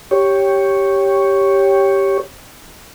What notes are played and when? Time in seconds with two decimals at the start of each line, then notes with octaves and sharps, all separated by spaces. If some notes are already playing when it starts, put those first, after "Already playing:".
0.11 G4 C#5